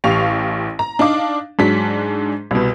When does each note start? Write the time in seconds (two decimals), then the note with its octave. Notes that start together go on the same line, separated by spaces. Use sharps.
0.04 A1 G4 F5 C#6 F7
0.79 A#5
0.99 D4 D#4 F5 D6
1.59 G#2 F#3 D4 B6
2.51 C2 B2